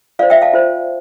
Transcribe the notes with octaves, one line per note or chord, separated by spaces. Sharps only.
F4 C5 D5 F5
E5 G5
F5 A5
F4 C5